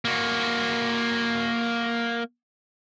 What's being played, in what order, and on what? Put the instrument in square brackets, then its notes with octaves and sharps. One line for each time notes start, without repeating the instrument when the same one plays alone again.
[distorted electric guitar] A#3 F#4